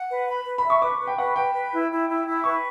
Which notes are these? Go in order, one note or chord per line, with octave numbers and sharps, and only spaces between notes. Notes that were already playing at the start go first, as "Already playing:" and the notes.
Already playing: F#5
B4
B5
B4
B5
E5
C#6
B4 D6
B4
G5
B4 F#5
B4 G5
B4
E4
E4
E4
E4
B4 C#6